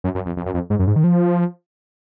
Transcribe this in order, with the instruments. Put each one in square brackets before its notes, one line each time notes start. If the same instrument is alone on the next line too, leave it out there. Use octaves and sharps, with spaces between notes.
[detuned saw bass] F#2
F#2
F2
F2
F#2
F2
G#2
F#2
G#2
D#3
F3